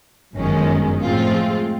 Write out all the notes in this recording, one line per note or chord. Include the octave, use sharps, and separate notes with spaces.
G1 F#2 D#3 G#3 C#4
A2 F3 G#3 C4 F4